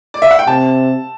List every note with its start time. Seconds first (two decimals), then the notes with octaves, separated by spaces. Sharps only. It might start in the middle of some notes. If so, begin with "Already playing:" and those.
0.14 D5
0.22 E5
0.31 F#5
0.39 G5
0.47 C3 A5